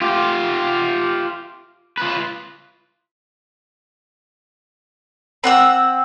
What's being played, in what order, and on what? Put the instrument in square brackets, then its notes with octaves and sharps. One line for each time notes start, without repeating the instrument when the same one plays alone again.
[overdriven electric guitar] F4 G4
F4 B4
[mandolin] C4 F#5 E6